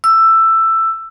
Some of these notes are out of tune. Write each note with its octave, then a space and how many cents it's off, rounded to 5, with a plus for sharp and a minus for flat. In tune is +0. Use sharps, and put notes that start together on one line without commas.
E6 +10